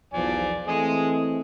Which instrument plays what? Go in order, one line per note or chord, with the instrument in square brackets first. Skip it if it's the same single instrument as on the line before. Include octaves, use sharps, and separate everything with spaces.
[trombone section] B1 E2 F3 [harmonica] D5 G#5
[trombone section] E3 A3 C4 [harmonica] G#4 D#5